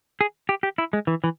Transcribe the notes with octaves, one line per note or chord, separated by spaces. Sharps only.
G#4
G4
G4
E4
G#3
E3
E3